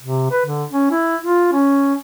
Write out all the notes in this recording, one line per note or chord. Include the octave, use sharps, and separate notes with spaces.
C3
B4
D3
C#4
E4
F4
C#4